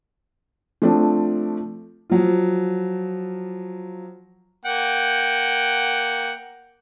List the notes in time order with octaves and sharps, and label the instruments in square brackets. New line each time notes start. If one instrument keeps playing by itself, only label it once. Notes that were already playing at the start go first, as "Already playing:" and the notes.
[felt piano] F3 A3 C4 D4
[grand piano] F3 F#3 F4
[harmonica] A#3 F#5 G5